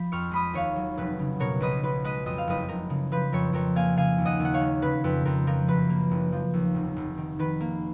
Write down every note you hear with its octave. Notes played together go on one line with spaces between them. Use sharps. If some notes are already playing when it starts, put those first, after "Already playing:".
Already playing: F3 B5
F2 C#6 F6
G#3 B5 D#6
D#2 C#5 F5
F#3
F1 B4
C#3
B2 A#4 C#5
B1 B4 D#5
B1 B4
G#3 B4 D#5
F2 D#5
F5
F#1 B4 D#5
F#1 A#4
C#3
F3 B4
F2 A#4 C#5
F2 A#4 C#5
A#3 F5 G#5
C#3 F5 G#5
D#2
D#5 F#5
D#2
F#5
C#5 F5
G#3
C#3 B4
F2 B4
F2 A#4
F3 A#4
F#2 B4
A#3
F#1
F3
D#2
F1
F1
D#3
D#3 B4
A#3